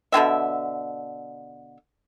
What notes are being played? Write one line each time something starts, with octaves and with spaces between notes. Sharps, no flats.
B2 D3 C4 E5